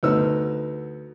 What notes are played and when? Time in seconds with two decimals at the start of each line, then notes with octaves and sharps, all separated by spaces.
0.03 D2 B3 D#4 E6